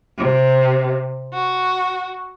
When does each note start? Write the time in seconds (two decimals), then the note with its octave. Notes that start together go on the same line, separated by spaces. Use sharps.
0.18 C3
1.32 F#4